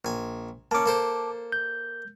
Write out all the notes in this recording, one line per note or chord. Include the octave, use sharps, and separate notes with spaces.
A#1 G#5
A#3 C#4 A5 D6
A#3 A4 C5
G6